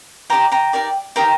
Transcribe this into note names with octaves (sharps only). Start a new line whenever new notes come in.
D#4 G4 A#4 D5 G5 A#5
G5 A#5
D#4 G4 A#4 D5
D#4 G4 A#4 G5 A#5